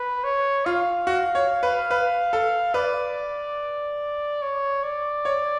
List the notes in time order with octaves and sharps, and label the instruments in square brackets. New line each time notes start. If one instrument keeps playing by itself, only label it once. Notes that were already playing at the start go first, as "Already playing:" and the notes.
Already playing: [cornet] B4
C#5
[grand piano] F4 [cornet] F5
[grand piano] F#4
C#5
B4
B4
A4
[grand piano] B4 [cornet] D5
[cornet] C#5
D5
[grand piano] C#5